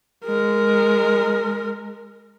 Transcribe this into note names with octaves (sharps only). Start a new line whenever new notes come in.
G#3 A#4